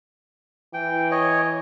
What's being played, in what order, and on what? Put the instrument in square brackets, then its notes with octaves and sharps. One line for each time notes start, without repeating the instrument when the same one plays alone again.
[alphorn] E3 [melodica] G5
[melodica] C#5 D#5